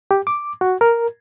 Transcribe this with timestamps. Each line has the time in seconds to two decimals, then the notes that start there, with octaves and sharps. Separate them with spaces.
0.11 G4
0.27 D6
0.61 F#4
0.81 A#4